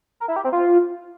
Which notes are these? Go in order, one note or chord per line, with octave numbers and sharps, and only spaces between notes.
A#4
E4
G4
C4
F4